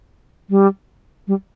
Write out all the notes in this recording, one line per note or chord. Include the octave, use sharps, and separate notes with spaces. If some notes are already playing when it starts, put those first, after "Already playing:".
G3
G3